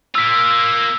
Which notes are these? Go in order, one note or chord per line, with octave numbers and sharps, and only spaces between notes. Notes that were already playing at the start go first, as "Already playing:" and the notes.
A#3 F4 E6 B6